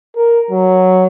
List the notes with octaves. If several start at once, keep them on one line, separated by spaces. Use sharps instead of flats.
A#4
F#3